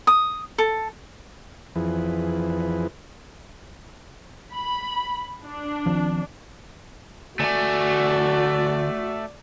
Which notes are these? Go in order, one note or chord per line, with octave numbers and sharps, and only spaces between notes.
D#6
A4
F2 E3 F3 E4 G#4 B4
B5
D4
D#3 F3 C4
D2 A3 F#4 D5 G#5